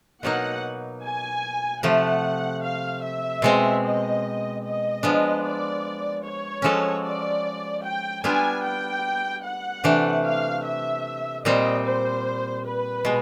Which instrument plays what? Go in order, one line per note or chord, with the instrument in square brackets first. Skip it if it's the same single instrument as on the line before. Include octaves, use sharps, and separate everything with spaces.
[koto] B2 F#3 A#3 D#4 [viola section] F#5
[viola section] G#5
[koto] C3 F3 A3 [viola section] F#5
[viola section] F5
E5
[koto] B2 G#3 C4
[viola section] D#5
D#5
[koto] F3 G#3 B3 D4
[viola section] D5
C#5
[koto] F3 G#3 C#4 F#4 A4
[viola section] D5
G5
[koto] G3 B3 D4 F4 [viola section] G#5
[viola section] G5
F#5
[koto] C3 E3 A3 D4
[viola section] F5
E5
[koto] A#2 G3 C4 [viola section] D#5
[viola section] C5
B4
[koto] B2 G#3